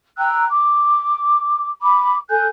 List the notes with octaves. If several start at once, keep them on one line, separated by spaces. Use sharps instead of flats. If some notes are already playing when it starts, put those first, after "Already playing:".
G5 A#5 E6 F#6
D6
B5 D6
A4 G#5 F#6 G6